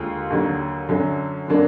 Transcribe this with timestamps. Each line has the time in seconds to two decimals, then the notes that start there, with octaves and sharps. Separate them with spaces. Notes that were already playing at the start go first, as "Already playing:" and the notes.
Already playing: D#2 D3 G#3 F4
0.30 D#2 D3 F#3
0.89 F#2 D3 F#3
1.48 D3 F#3 A#3 D4